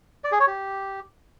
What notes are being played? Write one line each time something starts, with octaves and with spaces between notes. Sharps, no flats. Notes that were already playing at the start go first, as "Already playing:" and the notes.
D5
G#4
C#5
G4